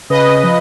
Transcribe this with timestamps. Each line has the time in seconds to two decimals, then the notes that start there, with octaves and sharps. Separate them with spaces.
0.10 C#3 B4 D#5
0.43 F3